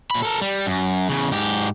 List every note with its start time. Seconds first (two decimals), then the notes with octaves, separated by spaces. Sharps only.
0.11 A#2 B5
0.22 A4 A#4
0.42 G3
0.66 F#2
1.09 E2 C#3
1.31 G#2 G4